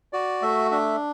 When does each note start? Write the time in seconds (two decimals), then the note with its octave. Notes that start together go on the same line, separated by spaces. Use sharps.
0.13 F#4 D5
0.42 A3 E5
0.71 D4 E5